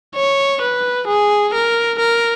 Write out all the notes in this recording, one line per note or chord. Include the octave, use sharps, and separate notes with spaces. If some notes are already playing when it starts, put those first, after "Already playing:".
C#5
B4
G#4
A#4
A#4